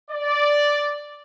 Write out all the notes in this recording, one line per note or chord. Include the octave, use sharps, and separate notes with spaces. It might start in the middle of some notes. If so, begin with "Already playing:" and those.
D5